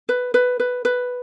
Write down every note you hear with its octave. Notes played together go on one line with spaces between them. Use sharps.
B4
B4
B4
B4